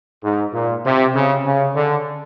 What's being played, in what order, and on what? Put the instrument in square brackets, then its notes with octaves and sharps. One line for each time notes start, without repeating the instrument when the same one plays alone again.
[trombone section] G#2
A#2
C3
C#3
C#3
D3